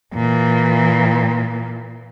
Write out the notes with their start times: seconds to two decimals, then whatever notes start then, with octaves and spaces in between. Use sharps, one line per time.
0.14 A#2 E3